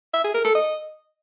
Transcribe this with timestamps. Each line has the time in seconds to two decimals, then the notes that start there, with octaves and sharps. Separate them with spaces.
0.14 E5
0.24 G#4
0.34 A#4
0.45 A4
0.55 D#5